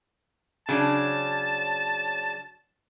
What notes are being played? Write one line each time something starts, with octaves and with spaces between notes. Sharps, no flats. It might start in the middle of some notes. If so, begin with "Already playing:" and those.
C#3 F#3 D4 A5